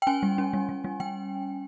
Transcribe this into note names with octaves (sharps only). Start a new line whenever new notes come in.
G5
C#4 G#5
G3
C#4
G3
G3
G3
G3 G5